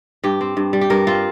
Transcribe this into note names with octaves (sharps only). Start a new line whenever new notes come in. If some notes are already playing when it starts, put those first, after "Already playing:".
G2 G4
C4
G2
G3
G4
G2 A#4
C4 F4